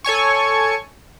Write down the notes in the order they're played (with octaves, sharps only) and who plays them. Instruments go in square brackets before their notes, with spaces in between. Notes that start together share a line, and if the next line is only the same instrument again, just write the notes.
[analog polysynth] A4 C#5 G#5 C#6